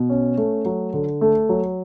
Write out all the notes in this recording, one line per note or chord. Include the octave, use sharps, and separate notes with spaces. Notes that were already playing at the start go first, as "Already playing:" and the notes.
Already playing: B2
C#4
A3
F#3
D3
A3
F#3